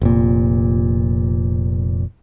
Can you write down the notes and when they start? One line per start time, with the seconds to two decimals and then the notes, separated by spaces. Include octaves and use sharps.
0.01 F1 A#2